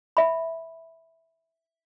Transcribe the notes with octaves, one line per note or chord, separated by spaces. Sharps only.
E5 B5